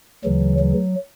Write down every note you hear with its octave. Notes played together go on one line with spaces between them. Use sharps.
D2 C#3 E3 F#3
F#3